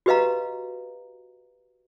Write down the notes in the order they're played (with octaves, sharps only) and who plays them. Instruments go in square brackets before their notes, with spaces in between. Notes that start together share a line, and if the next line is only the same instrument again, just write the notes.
[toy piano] F#4 G4 B4 D#5 F5 A#5